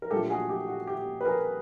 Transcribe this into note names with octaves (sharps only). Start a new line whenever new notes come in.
A#4
A#2 F#3 A3 D4 F4 G4 A4
F#4 G#4
G4
F#4
G4
B4
G#4 A#4